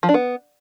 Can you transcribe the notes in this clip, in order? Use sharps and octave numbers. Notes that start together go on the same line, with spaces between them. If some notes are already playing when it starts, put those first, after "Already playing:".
F3
D4
B3